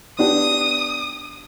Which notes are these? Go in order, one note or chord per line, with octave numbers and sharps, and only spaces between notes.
B3 D4 G4 D#6